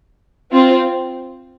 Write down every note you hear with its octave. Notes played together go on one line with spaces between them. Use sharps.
C4 F4